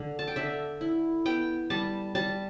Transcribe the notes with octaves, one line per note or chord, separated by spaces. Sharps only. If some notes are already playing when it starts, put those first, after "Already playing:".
Already playing: D3
A5
G5
D3 E5
E4
B3 G5
G3 A5
G3 A5